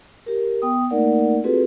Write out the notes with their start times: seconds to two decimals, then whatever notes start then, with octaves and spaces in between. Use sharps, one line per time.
0.26 G4 A#4
0.62 B3 G5 D#6
0.90 A3 A#3 D#4 A#4 D5 F#5
1.44 C4 F4 F#4 G#4 A4 B4